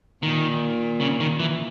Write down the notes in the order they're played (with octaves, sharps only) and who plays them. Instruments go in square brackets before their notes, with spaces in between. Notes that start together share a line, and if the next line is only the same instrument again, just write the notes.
[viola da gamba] A#2 [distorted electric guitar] D#3
[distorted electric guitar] C#3
D#3
E3